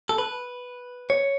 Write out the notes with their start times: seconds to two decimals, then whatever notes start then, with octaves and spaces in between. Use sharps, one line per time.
0.09 A4
0.18 B4
1.10 C#5